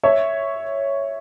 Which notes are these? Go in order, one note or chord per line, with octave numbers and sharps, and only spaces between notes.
C#5 E5